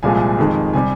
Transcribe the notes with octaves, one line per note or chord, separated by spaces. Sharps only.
C2 A#2 F3 G#3 G#5
F2 D#3 G#3
C3 G3 G#5